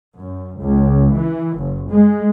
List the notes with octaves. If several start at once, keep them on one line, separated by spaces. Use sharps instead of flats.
F#2
C#2
E3
F#1
G#3